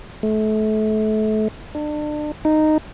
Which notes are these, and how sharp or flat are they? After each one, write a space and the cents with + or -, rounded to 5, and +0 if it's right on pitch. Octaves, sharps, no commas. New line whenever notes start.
A3 -30
D4 +35
D#4 -10